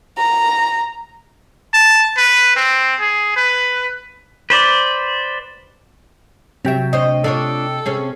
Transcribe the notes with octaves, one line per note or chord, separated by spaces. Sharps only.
A#5
A5
B4
C4
G#4
B4
B4 C5 D5
C3 F#3 E5 G5
D2 C5 C#5 D#5
D4 F4 A4 C#5
C3 C#4 G#4